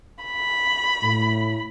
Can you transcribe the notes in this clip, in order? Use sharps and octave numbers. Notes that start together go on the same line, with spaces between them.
B5
A2